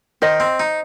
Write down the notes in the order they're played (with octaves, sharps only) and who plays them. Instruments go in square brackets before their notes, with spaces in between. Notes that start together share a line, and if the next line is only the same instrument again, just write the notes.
[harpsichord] D#3 [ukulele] C5 D#5
[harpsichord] C4
D#4